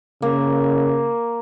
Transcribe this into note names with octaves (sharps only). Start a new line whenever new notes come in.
C#3 A#3